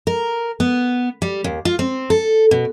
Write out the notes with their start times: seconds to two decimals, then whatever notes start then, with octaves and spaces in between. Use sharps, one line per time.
0.07 A#4
0.60 B3
1.22 G3
1.44 D#2
1.65 F4
1.79 C4
2.10 A4
2.51 B2